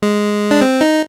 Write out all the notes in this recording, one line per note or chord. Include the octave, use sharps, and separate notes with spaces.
G#3
D4
C4
D#4